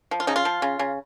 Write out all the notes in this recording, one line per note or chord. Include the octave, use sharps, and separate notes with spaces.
F3
F4
C#3 D#4
F4
F3
C#3
C#3